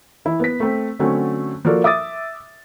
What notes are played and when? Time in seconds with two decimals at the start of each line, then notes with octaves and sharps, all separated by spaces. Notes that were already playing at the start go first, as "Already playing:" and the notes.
0.25 E3 E4
0.40 B3 B4 B6
0.60 A3 C4
0.99 D3 F#3 A3 C4 C#4
1.65 F3 A#3 F#4 A4 A#4 D5
1.84 E5 D6 D#6 A6